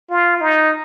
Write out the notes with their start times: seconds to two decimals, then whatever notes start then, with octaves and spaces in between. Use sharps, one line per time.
0.10 F4
0.41 D#4